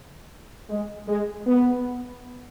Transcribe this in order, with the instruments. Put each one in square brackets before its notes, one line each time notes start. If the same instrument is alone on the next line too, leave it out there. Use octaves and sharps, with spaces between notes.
[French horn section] G#3
G#3
B3